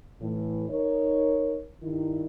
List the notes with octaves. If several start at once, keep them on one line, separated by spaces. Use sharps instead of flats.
A2 E3
D#4 A#4 C#5
G2 D#3 E4